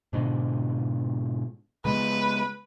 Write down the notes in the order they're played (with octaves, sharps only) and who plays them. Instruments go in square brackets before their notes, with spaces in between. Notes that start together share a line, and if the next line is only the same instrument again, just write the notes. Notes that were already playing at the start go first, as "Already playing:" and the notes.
[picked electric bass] G#2 B2 D3
[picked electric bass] C#3 G#3 B3 [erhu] B4